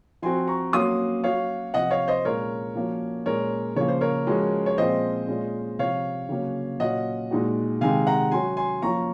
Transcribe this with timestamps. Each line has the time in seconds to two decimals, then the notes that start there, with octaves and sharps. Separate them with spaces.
0.22 F3 C4 F#4 G#5 C6
0.47 A#5 C#6
0.73 F#3 A#3 C#4 F#4 C6 D#6
1.24 F#3 C#4 F#4 C#5 F5
1.74 C3 F3 C4 D#5 F#5
1.91 C#5 F5
2.08 C5 D#5
2.25 A#2 G#3 C#4 F4 A#4 C#5
2.75 F3 A#3 C#4 F#4
3.26 A#2 G#3 C#4 A#4 C#5
3.76 C#3 F3 A#3 C#5
3.88 C5
4.01 A#4 C#5
4.27 F3 G#3 C#4 F#4
4.66 C#5
4.78 A#2 F3 G#3 C4 F4 C5 D#5
5.28 A#2 G#3 C#4 F4
5.79 C3 F3 C4 C#5 F5
6.29 C#3 F#3 A#3 C#4
6.79 A#2 F#3 C#4 F4 D#5 F#5
7.31 A#2 G#3 D#4 F#4
7.81 C3 D#3 G#3 F5 G#5
8.07 F#5 A#5
8.31 F#3 C#4 F#4 G#5 C6
8.57 G#5 C6
8.82 F3 A#3 C#4 F4 A#5 C#6